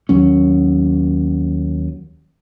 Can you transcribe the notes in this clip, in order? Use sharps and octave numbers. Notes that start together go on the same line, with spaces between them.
D#2 F#3 C#4